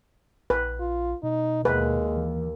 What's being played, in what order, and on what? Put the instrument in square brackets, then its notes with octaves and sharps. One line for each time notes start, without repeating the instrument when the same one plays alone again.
[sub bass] A#1 [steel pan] B4
[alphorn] F4
[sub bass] B2 [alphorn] D#4
[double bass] D#2 [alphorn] G#3 [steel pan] B4
[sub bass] E3